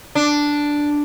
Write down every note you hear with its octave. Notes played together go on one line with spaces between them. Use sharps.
D4